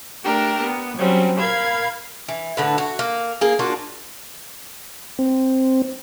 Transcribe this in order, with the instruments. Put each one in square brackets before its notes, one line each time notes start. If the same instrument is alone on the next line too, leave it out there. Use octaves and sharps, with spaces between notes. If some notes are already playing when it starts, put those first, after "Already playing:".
[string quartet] A3 D4 G4 A#4
B3
F#3 G3 C4 C#4
A#4 F5 B5 G#6
[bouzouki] E3
A2 D3 B4
F#4
A#3
A#3 G#4
A#3 D4 F4 F#4
[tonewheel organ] C4